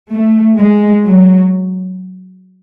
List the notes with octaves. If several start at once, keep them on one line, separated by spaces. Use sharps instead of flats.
A3
G#3
F#3